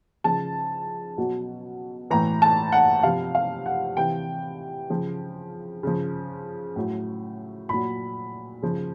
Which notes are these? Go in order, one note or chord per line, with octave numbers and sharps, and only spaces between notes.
C#3 F3 A5
B2 F#3
A2 E3 A#5
A5
F#5
C3 F3 F5
F5
F#5
C3 E3 G5
C#3 F3
C#3 F3
A2 F#3
A#2 F#3 B5
C#3 F3